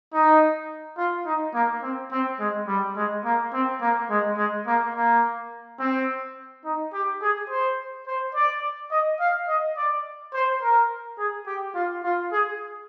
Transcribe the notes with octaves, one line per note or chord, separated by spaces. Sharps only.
D#4
F4
D#4
A#3
C4
C4
G#3
G3
G#3
A#3
C4
A#3
G#3
G#3
A#3
A#3
C4
D#4
G4
G#4
C5
C5
D5
D#5
F5
D#5
D5
C5
A#4
G#4
G4
F4
F4
G#4